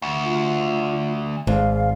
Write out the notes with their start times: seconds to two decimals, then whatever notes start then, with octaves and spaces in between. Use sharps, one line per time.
0.02 D2
0.23 F4
1.47 G#1 G#2 F5